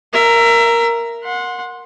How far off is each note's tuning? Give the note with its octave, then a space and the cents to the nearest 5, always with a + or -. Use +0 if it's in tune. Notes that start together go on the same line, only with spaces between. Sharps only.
A#4 +0 E5 +25
F#5 -25 C6 +5